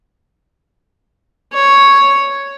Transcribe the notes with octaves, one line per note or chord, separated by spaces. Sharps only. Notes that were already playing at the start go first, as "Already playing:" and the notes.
C#5